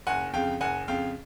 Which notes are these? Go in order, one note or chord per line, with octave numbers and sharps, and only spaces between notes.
F#1 F#5 G#5
F2 C#3 F5 G5
F#1 F#5 G#5
F2 C#3 F5 G5